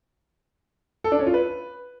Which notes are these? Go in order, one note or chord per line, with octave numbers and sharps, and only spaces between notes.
A4
D4
C#4
F4
B4